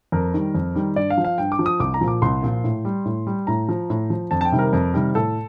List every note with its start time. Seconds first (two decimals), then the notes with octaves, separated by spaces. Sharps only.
0.12 F2 A#4
0.34 D#3 G3
0.55 F2
0.75 D#3 G3
0.96 G2 D5
1.10 F5
1.18 F3
1.24 F5
1.38 G2 G5
1.52 D6
1.59 F3
1.66 D#6
1.80 C2 D6
1.94 A#5
2.01 A#2 F3
2.08 D6
2.22 C2 C6
2.43 A#2 F3
2.64 A2
2.85 G3
3.05 A2
3.27 G3
3.47 A2 A#5
3.69 F3
3.90 A2
4.10 F3
4.31 F2 A5
4.41 A5
4.45 G5
4.52 C3 D#3 G3
4.59 A#4
4.73 F2
4.94 C3 D#3 G3
5.15 A2 A4